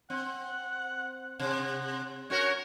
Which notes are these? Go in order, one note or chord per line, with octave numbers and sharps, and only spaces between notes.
C4 F#5
C3 F#5
C#4 F#4 A#4 C#5